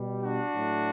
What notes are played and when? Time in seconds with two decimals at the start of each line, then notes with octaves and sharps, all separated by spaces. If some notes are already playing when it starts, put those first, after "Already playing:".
Already playing: B2 G3
0.22 D4 F#4
0.54 A2 F#3 A3